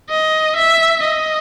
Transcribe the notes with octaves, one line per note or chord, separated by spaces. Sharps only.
D#5
E5
D#5